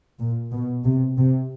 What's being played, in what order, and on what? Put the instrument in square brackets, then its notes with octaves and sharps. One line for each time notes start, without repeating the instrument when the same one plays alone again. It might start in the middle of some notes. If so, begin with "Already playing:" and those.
[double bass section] A#2
B2
C3
C3